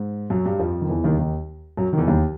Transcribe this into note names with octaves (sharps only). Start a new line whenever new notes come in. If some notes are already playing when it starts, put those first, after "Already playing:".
Already playing: G#2
F#2 F#3
G2 G3
F2 F3
D#3
E2 E3
D#2 D#3
D#2 D#3
F#2 F#3
D#3
E2 E3
D#2 D#3